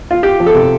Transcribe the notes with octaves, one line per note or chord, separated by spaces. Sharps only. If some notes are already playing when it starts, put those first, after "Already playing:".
F4
F4 G4
F3
A4
C3